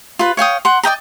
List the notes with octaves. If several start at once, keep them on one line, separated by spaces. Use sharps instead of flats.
F4 B4
C#5 F5 G5 D#6
F#5 C6
D5 D#5 G5 A#5